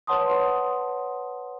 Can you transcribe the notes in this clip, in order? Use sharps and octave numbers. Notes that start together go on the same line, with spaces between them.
B4 C#5 F#5 A5 C6 D#6